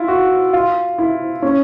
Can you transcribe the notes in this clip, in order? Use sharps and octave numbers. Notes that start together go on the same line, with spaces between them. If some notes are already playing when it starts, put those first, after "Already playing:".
Already playing: E4 F4
F#4
F4
E4
C#4